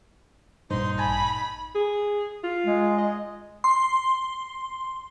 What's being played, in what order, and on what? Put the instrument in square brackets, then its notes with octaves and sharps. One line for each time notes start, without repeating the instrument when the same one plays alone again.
[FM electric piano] A#1 C5 [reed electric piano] G2 A#2 [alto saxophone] D#4 [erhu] C6
[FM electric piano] A1 G#5 A5 [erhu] B5
[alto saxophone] G#4
F4
[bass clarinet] G#3
[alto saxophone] D#5
[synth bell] C6